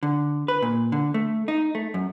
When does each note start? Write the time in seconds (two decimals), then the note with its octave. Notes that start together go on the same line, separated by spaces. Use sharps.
0.03 D3
0.48 B4
0.62 A#2
0.92 D3
1.14 A3
1.48 D#4
1.75 A3
1.94 F#2